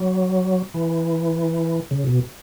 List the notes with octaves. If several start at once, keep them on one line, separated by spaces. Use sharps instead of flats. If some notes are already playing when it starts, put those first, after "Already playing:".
Already playing: F#3
E3
C#3
B2